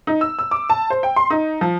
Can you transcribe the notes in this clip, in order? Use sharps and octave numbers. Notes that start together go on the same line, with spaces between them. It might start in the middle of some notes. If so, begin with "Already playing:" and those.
D#4
E6
E6
D6
A5
C5
G5
C6
D#4
F3